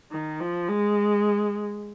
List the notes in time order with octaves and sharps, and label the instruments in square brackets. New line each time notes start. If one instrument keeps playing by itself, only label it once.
[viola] D#3
F3
G#3